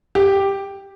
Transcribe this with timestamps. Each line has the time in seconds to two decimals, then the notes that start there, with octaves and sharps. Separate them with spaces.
0.15 G4